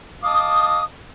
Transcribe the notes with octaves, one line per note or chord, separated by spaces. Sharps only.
D#5 F5 A5 D6 D#6